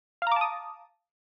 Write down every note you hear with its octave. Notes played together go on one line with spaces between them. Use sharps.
F5 A5 A#5 D6 D#6